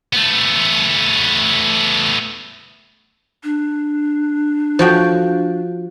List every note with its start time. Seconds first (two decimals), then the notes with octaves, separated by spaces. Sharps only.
0.13 A3 B3
3.44 D4
4.79 F3 F#4 G5